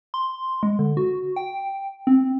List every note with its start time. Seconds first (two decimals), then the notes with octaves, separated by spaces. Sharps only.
0.14 C6
0.63 G#3
0.79 D3
0.97 F#4
1.36 G5
2.07 C4